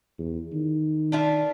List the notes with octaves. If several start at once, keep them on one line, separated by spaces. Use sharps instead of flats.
E2
D#3
D4 F4 E5